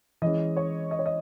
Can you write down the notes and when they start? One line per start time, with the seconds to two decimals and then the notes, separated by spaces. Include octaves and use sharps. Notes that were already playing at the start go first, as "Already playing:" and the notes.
0.22 E3 G#3 C#4 D#5
0.56 C#5
0.91 D#5
0.99 C#5
1.06 D#5